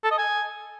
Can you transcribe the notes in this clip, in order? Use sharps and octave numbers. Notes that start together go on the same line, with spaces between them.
A4
D#5
G#5